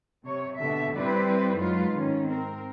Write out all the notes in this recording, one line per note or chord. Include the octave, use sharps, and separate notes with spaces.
C3 C#5
B2 D3 E5
G3 C4 E4 B4 C5 D5
F#2 F#3 G#3 D#4 F4 B4
G#2 D#3 C#4
C4 A#4